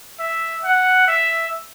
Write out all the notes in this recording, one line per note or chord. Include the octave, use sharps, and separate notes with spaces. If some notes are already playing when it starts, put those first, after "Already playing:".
E5
F#5
E5